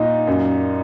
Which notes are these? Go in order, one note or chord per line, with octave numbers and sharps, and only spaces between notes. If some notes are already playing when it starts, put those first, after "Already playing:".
Already playing: A#2 D#4
F#2